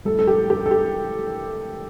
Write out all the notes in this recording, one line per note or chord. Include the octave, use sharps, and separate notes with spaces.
A2 G3 A4
A4
G4
G4
A4
G4